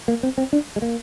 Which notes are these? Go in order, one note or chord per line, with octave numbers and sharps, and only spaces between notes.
A#3
C4
C4
D4
G#3
A#3